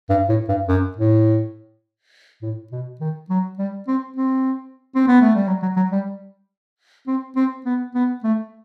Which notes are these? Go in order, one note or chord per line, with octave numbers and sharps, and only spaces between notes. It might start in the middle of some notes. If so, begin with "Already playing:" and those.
G2
A2
G2
F#2
A2
A2
B2
D#3
F#3
G3
C4
C4
C4
B3
A3
G3
F#3
F#3
F#3
G3
C4
C4
B3
B3
A3